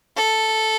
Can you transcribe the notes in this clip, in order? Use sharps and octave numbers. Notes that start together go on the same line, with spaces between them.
A4